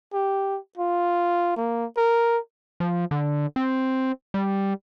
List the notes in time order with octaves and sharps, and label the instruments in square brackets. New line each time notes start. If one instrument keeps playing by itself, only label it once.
[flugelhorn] G4
F4
A#3
A#4
[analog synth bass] F3
D3
C4
G3